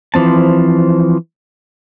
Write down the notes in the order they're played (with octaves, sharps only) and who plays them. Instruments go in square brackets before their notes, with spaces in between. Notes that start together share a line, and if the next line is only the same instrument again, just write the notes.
[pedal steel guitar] E3 F3 C4 A5